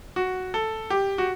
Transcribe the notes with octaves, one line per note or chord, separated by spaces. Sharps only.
F#4
A4
G4
F#4